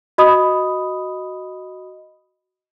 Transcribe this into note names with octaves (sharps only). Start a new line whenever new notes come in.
F#4 D#5 B5 D#6